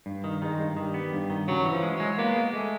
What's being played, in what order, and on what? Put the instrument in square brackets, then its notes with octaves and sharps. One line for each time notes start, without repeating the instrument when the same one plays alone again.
[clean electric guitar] G2
D#3
[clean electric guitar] D#3 [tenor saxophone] G#3
[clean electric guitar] G2
[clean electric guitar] D#3 [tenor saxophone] G3
[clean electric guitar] B3
G2
D#3
[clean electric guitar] C#3 [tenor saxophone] F#3
[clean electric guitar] E3
[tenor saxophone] F3
[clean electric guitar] G#3
[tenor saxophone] F#3
[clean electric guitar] G#3
[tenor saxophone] A#3 [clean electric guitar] B3
[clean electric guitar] G#3
[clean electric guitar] G#3 [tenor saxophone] A3